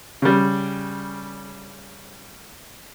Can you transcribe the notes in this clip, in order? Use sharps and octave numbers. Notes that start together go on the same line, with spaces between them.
C#3 G3